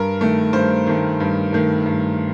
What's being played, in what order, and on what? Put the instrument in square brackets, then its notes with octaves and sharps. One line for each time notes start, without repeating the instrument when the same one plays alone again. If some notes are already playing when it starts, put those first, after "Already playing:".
Already playing: [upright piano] G2 A#4
D#3 A3
G2 C5
D#3 A3
G2
D#3 A3
G2